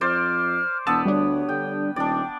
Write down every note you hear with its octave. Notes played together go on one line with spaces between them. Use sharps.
F2 C5 D5 F6
E1 B3 A5 E6
D2 G3 D4 C#5
D3 G5
D#1 D4 D5 G5